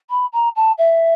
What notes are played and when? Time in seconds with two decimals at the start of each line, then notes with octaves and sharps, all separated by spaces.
0.10 B5
0.33 A#5
0.56 A5
0.78 E5